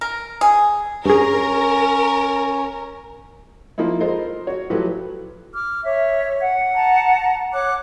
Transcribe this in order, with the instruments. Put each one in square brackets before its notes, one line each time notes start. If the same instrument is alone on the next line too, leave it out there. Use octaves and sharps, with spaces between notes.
[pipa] A#4
G#4
[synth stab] G2 G#4 [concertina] C#4 [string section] A#4
[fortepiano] F3 A#3 D#4 E4
G#3 F4 A4 A#4 C5 D#5
F#4 C#5
A2 F3 F#3 G4 A4 B4
[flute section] D6 F6
[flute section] C#5 [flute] E5
[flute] F#5
[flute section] A5 A#5
[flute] C#5 [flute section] F#5 D6 F#6